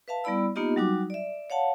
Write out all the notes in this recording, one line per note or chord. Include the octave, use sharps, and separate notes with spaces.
B4 E5 F5 A5
G3 B3 E4 D5 B5 E6
A#3 B3 D#4 F4 G4 D#5
F#3 G3 D#4 F#4 D6
D5 E5
C#5 F5 F#5 A5